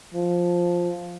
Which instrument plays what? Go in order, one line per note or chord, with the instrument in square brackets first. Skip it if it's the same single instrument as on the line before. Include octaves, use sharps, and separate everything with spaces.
[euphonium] F3